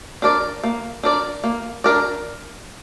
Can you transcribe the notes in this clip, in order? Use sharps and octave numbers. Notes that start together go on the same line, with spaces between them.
D4 A#4 D5
A#3
D4 A#4 D5
A#3
D4 A#4 D5